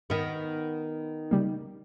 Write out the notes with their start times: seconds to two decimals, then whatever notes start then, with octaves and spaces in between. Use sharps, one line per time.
0.10 D#3 B3
1.31 C#3 G3 A#3